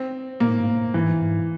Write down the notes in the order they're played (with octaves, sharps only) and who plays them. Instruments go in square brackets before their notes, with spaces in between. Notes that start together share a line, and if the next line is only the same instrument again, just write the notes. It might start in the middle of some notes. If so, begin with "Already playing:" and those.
Already playing: [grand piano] C4
[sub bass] A#2 [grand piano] A#3
[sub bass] A2
G#2
A2
[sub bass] G#2 [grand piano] E3
[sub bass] G#2